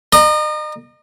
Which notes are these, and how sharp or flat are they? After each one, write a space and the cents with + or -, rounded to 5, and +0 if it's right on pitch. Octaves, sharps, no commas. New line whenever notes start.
D#5 -40 A#5 +0